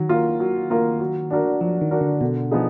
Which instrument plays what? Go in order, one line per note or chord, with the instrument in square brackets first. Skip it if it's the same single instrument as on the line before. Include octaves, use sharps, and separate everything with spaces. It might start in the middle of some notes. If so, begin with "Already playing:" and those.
Already playing: [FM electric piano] D#3 [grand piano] F#3
[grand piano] A#3 F4 A#4
F#3
A#3 F4 A#4
F#3
D4 F#4 A#4
[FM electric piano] F3 [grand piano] F#3
[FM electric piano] D#3
[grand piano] D4 F#4 A#4
[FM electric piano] D3
[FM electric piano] B2 [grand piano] D3
[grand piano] F3 B3 D#4 G#4